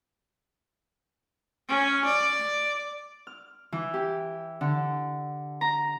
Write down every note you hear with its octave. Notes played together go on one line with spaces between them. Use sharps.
C#4
D5
F6
E3
G4
D3
A#5